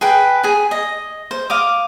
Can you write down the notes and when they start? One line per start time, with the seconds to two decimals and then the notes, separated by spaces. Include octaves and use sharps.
0.01 G#4 B4 G5
0.43 G#4 G#5
0.71 D#5
1.31 C5
1.50 F5 D6 D#6